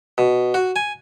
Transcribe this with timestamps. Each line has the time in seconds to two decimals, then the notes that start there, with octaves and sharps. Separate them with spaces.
0.18 B2
0.54 F#4
0.76 G#5